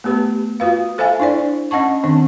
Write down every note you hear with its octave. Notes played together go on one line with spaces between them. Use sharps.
A3 B3 G4 B4
F4 F#4 B4 F5
A4 C5 E5 F5 G#5
D4 E4 C5 D5
C#4 D#5 F#5 A5 C#6
D#3 C4 D4